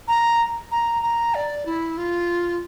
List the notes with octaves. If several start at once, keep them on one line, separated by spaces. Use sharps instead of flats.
A#5
A#5
A#5
D5
E4
F4